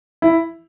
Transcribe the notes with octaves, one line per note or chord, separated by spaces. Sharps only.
E4